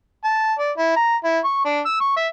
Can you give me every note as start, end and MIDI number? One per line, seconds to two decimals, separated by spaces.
0.24 0.53 81
0.59 0.71 74
0.77 0.93 64
0.96 1.16 82
1.24 1.39 64
1.44 1.63 85
1.65 1.80 62
1.85 1.99 88
2.00 2.12 85
2.17 2.27 76